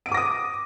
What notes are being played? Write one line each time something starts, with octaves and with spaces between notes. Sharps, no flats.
D6 D#6 A#6 D7 D#7